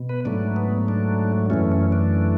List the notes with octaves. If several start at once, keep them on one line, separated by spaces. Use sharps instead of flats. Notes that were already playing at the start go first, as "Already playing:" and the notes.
Already playing: B2
B4
G#2 F#3 A3 D4
B3
D4
F#2 E3 A3 C#4
C#4
D4